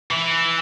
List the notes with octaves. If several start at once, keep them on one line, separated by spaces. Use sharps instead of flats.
E3